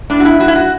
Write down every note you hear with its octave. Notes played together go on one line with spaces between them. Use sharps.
A2 D4
F#4
E4
F#3 F#4
E4
F#4